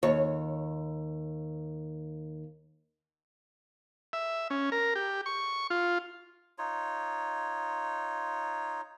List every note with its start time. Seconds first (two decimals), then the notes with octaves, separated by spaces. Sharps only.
0.03 D#2 C#5
4.13 E5
4.50 C#4
4.72 A#4
4.96 G4
5.26 C#6
5.70 F4
6.58 D#4 F4 C#5